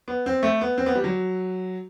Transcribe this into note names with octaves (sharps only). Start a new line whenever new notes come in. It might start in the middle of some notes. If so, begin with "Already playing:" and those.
B3
C4
A3
B3
C4
B3
G3
F#3